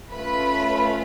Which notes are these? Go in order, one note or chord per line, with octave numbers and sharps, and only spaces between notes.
A3 C#4 F4 B4 B5